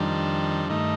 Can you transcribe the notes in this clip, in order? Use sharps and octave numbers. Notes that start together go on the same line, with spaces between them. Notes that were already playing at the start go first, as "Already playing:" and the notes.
Already playing: F2 D#3 G3 D4
G2 D#3 A3 D#4